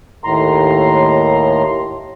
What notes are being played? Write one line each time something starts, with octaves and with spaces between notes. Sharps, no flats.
D#2 A2 A#5 C6